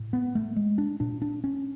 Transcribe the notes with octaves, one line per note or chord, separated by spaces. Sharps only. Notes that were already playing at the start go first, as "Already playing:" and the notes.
Already playing: A2
B3
A3
G#3
D4
A#2 D4
D4
C#4